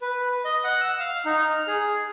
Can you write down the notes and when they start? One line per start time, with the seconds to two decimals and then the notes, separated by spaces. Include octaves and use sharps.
0.02 B4
0.45 D#5
0.64 F#5
0.81 E6
1.00 F5
1.25 D#4
1.42 F6
1.67 G#4